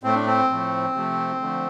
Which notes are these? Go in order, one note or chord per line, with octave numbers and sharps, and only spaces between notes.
A2 A3 C4
D4
C4
A2 F3 A3
C3 F3 A3
D3 F3 A3